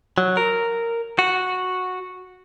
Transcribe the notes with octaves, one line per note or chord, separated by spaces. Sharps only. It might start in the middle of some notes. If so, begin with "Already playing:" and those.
F#3
A#4
F#4